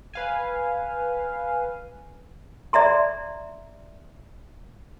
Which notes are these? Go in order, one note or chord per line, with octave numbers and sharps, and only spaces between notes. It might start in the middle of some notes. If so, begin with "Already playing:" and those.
B4 F5 G#5
D5 E5 A#5 C6